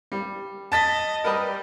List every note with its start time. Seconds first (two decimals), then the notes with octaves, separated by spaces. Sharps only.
0.12 G3
0.72 D#5 A5 A6 B6
1.24 G3 A#4 B4 D#5